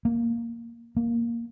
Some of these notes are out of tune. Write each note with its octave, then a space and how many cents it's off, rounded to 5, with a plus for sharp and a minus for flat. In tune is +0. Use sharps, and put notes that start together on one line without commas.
A#3 +0
A#3 +0